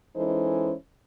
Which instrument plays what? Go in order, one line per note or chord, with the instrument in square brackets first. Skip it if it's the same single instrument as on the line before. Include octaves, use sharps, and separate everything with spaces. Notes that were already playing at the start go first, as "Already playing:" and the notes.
[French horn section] E3 G#3 C#4 D#4 A4 C5